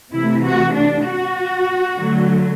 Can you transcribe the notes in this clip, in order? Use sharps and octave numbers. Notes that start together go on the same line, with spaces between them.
C3 E3 A3 E4
F#4
D4
F#4
D3 F#3 A3